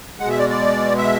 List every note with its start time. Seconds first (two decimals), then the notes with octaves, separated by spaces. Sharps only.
0.20 G#3 F#5
0.25 B2 E5
0.39 D5
0.50 D5
0.98 E5